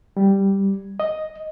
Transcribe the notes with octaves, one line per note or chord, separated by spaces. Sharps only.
G3
D#5